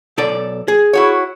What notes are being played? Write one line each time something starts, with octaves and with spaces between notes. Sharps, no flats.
B1 A4 D5
G#4
E4 F#4 C#5